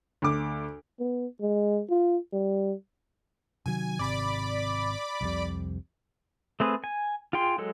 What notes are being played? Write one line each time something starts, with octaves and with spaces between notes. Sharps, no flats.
D2 D6
B3
G#3
F4
G3
C3 D#3 F#3 G#5
G#1 C3 D5 B5 D6
C2 F2 C3
A3 C4 G#4 B4
G#5
F4 G#4 G5 C6
F#3 G#3 A4